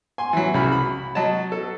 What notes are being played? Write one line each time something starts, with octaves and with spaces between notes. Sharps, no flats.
G#5 C6
E3 F#3
C2 C#3 F#4 B5
B5
F#3 D#5 A5
A4